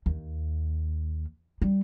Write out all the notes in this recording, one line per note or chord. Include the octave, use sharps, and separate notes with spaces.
D#2
G3